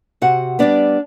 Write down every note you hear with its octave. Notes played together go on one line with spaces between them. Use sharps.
C3 F#4 F#5
G3 B3 D4 D5